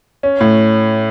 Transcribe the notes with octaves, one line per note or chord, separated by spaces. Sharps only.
C#4
A2